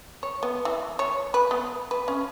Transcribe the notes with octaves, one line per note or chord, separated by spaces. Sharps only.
C#5
B3
E3
C#5
B4
B3
B4
C#4